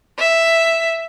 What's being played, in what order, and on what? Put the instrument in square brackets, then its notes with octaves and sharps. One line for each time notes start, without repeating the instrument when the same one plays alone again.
[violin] E5